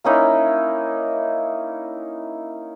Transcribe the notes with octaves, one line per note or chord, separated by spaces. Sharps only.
A#3 C#4 D#4 E4